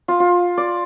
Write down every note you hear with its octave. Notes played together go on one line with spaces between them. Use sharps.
F4
F4
D5